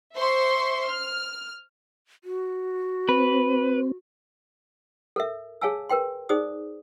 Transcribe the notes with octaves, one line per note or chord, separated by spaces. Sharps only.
C5 E5 C6 C#6
F6
F#4
C4 B4
A4 A#4 E5
G#4 C#5 F5 G#5 A5 E6
A#4 B4 G5 C6
D#4 G#4 C5 D5 D#6